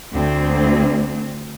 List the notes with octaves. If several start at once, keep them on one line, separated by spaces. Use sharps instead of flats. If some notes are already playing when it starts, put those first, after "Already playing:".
D2 C4